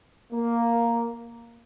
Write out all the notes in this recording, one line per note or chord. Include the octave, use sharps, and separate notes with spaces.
A#3